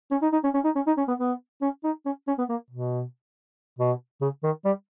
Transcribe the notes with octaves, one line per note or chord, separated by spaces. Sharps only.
C#4
D#4
D#4
C#4
C#4
D#4
C#4
D#4
C#4
B3
B3
C#4
D#4
C#4
C#4
B3
A#3
B2
B2
C#3
D#3
G3